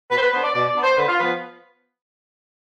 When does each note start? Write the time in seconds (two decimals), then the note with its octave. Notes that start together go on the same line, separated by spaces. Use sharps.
0.11 B2 B4
0.17 C5
0.22 B4
0.32 B3 D4 C5
0.43 D5
0.54 B2 D5
0.68 D5
0.76 B3 D4
0.83 C5
0.97 D3 B4
1.08 F4
1.19 F3 B3 B4